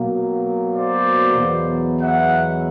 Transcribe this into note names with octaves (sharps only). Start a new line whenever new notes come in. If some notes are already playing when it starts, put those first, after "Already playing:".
Already playing: B2 F#3 A#3
C5 D5
E2 B2 F#3 B3
E5 F#5